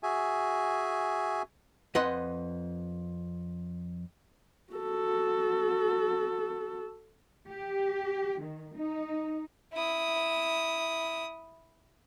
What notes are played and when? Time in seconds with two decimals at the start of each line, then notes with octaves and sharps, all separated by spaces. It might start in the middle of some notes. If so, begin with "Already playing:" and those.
0.03 F#4 G#4 E5 G#5
1.95 F2 B4 D#5 F#5 C6
4.73 F#4 A4
7.50 G4
8.42 D#3
8.76 D#4
9.73 E4 D#6